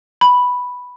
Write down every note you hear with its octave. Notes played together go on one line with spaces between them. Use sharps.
B5